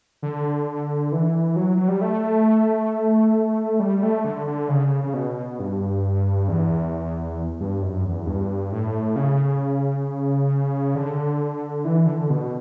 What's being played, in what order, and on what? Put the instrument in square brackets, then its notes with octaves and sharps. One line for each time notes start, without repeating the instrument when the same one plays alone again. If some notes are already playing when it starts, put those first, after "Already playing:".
[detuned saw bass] D3
E3
F#3
F#3
G3
A3
G3
A3
D3
D3
C#3
C#3
B2
G2
E2
G2
F#2
E2
G2
A2
C#3
D3
E3
D3
B2